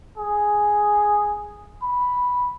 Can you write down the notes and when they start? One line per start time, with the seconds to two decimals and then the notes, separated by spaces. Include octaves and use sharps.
0.18 G#4
1.82 B5